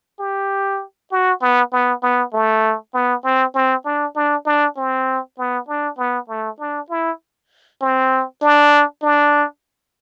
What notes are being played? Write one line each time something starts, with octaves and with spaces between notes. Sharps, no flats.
G4
F#4
B3
B3
B3
A3
B3
C4
C4
D4
D4
D4
C4
B3
D4
B3
A3
D4
E4
C4
D4
D4